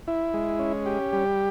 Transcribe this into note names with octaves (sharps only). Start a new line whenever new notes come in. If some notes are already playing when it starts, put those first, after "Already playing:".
E4
G#3
C#4
G4
G3